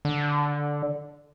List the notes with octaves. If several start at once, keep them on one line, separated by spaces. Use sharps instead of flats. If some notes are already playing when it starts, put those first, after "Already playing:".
D3